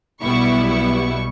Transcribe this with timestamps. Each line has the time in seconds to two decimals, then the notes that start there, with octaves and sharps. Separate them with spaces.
0.22 B1 B2 G3 B3 E4 C#6
0.69 C#6